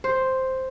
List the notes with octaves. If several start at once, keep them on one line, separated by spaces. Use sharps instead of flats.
C5